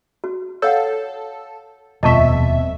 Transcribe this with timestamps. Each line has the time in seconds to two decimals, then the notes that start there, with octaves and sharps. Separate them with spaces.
0.24 F#4
0.62 A4 C#5 F5 F#5
2.03 D#1 F2 B2 D#5 E5 A5 C#6